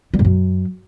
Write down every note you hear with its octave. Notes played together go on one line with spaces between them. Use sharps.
G3
G#2
F#2